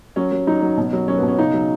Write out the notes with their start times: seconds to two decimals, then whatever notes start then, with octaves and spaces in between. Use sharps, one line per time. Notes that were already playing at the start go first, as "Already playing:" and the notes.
0.16 F#3 C#4
0.32 F#3
0.47 F#3 D#4
0.62 F#3
0.77 B2
0.93 F#3
1.08 F#3 C#4
1.18 B3
1.23 B2
1.28 C#4
1.39 C#3 D#4
1.54 F#3